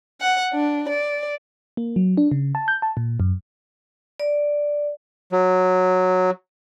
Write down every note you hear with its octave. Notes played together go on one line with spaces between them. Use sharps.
F#5
D4
D5
A#3
F#3
D4
C#3
A5
G6
A5
A#2
F#2
D5
F#3